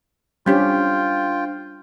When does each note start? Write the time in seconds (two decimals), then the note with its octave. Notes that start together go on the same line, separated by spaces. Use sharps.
0.46 G3 C#4 D4 F4 G4 C5 G5